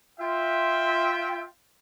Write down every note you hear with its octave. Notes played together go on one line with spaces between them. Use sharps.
F4 E5 G5